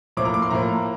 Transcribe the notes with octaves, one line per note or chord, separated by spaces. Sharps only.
A2 F3 A#3 D6
A#5
D6
C6
A2 F3 A#3 A#5